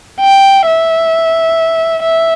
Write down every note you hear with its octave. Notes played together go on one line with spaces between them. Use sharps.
G5
E5
E5